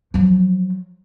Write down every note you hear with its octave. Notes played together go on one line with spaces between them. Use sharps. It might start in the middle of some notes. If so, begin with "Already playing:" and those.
F3 F#3